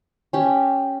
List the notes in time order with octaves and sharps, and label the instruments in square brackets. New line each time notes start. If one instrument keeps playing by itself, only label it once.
[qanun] C#4 G4